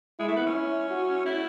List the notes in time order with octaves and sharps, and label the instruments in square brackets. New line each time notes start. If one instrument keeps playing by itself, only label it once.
[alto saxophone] G#3 [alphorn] E4
[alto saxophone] A3
B3
C#4
[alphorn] E4
F#4
[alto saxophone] E4